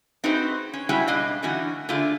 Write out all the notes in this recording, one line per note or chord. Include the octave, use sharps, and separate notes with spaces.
C4 D#4 F#4 G#4 B4 C5
C#4
G3 G#3 C#4 E4 F#4 G#4
B2 G3 D4 D#5 F5
D3 E3 A3 C#4 D#4 F#4
D3 A3 F4 G#4